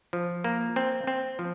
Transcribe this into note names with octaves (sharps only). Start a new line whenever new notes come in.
F3
A#3
C4
C4
F3